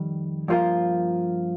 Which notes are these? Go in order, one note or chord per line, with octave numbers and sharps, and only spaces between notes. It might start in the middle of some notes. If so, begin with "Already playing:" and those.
Already playing: F2 D#3 G3
G2 F3 A#3 F4 A#4